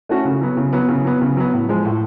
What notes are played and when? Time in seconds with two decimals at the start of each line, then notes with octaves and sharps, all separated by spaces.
0.09 A3 C#4 F#4
0.25 C#3
0.41 F#3 B3
0.57 C#3
0.73 F#3 B3
0.89 C#3
1.04 F#3 B3
1.21 C#3
1.37 F#3 B3
1.53 A2
1.69 F3 G#3
1.85 A2